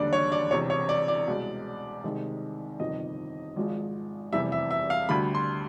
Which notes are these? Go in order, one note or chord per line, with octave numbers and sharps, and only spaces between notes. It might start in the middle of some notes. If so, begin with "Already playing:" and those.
Already playing: E1 D#2 D3 G3 D5
C#5
D5
E1 E2 C3 C#5
C#5
D5
D5
C2 B2 G#3
C2 C3 D#3 G#3
G1 F2 C3 D#3 G3 D#5
G#1 G#2 F3 G#3
F1 E2 C3 E3 G3 E5
E5
E5
F5
D2 D3 G3 B5
C6